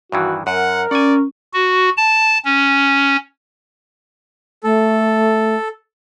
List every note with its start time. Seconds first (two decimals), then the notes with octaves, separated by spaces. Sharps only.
0.12 G2 D#3 E3 F#4
0.47 F#2 A#4 F#5
0.91 C#4 D5 F#5 G#5
1.53 F#4
1.97 A5
2.45 C#4
4.64 A3 A4